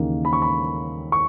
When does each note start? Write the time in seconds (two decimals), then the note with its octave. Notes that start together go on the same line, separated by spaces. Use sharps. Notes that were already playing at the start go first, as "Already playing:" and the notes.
Already playing: D#2 C#3 E3 A#3 D#4
0.25 B5
0.33 C#6
0.42 B5
1.12 C#6